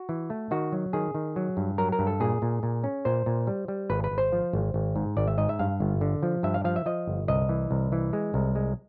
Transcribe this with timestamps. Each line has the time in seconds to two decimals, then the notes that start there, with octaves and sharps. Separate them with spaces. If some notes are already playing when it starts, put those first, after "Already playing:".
Already playing: F#4
0.09 E3
0.30 A3
0.51 D#3 F#4
0.72 F#3
0.93 D#3 G#4
1.14 D#3
1.36 F#3
1.57 G2
1.78 F#3 A#4
1.92 A#4
1.99 G2
2.07 A4
2.20 A#2 G#4
2.42 A#2
2.63 A#2
2.84 C#4
3.05 A#2 C5
3.26 A#2
3.47 G3
3.68 G3
3.90 G#1 B4
4.04 B4
4.11 G#1
4.18 C5
4.32 F3
4.53 G#1
4.74 G#1
4.96 G#2
5.17 G#1 D5
5.28 E5
5.38 G#2 D#5
5.49 E5
5.59 G2 F5
5.80 G1
6.01 D3
6.23 F3
6.43 G2 E5
6.54 F5
6.64 F3 F5
6.76 E5
6.86 F3 D#5
7.07 G1
7.28 C2 D#5
7.49 E3
7.71 C2
7.92 E3
8.13 G#3
8.34 C2
8.55 G#3